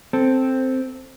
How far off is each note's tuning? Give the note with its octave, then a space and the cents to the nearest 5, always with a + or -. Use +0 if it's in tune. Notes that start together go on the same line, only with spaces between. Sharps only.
C4 +0 A4 +5